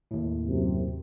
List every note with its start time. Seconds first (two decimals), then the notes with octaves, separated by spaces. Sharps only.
0.11 D#2 A2
0.47 F#2 C3